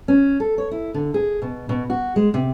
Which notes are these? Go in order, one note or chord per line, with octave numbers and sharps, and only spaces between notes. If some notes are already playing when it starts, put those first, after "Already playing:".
C#4
A4
C#5
E4
D3
G#4
B2
B2
F#4
G#3
C3